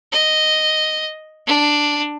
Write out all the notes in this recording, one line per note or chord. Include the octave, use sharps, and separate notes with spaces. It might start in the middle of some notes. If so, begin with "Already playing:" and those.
D#5
D4